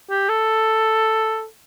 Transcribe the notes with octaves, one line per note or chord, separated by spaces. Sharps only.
G4
A4